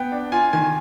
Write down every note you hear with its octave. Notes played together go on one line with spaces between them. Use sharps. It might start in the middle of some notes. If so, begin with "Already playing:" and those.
Already playing: B3 G5
D4
F4 G#5
D#3 G#5